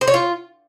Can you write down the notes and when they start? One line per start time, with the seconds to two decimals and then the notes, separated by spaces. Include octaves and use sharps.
0.01 C5
0.07 C#5
0.14 F4